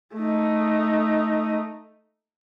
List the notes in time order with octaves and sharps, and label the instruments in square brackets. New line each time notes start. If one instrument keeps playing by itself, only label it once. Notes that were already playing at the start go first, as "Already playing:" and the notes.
[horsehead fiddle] A3 D#4